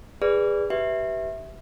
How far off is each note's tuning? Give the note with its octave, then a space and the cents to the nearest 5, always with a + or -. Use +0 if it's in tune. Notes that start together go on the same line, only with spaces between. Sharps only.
G#4 -20 B4 +0 D5 +0
G4 -20 B4 +0 E5 -10